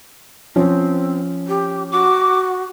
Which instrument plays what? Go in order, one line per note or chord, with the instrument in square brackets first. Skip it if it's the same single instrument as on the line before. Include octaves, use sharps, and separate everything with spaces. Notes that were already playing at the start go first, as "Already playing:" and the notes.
[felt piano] F3 C#4 [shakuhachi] C4
[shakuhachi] G4
[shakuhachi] F#4 [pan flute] D6